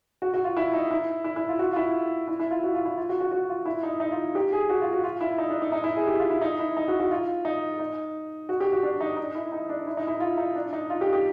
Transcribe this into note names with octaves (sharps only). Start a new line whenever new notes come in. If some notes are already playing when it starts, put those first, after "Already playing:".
F#4
F#4
F4
E4
D#4
E4
E4
E4
F4
F#4
F4
E4
E4
E4
F4
F#4
F4
E4
F4
F#4
F#4
F#4
F4
E4
D#4
D#4
F4
G4
G#4
F#4
F4
F#4
F4
E4
D#4
D4
D#4
D#4
E4
G#4
G4
F4
E4
D#4
E4
D#4
F#4
F#4
F4
D#4
D#4
F#4
G4
F#4
D4
D#4
D#4
E4
D#4
D4
E4
D#4
E4
F4
D#4
D4
D#4
F4
G4
G4